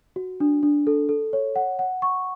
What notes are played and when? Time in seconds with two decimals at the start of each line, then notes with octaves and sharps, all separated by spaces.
0.16 F#4
0.40 D4
0.63 D4
0.87 A4
1.09 A4
1.33 C#5
1.56 F#5
1.79 F#5
2.02 C#6